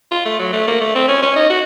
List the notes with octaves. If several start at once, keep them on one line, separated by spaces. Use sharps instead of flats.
F4
A3
F#3
A3
A#3
A3
C4
C#4
C#4
D#4
F#4